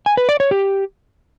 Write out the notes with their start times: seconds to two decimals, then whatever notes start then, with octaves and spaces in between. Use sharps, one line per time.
0.06 G#5
0.17 B4
0.29 D5
0.40 C#5
0.51 G4